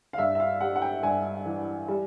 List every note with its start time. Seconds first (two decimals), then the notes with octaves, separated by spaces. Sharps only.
0.13 F5
0.18 G2 E5
0.35 E5
0.40 F5
0.61 G3 F#5
0.76 F#5
0.82 G5
1.03 G2 G#5
1.46 E3
1.88 G3